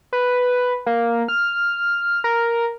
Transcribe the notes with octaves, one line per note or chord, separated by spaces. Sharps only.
B4
A#3
F6
A#4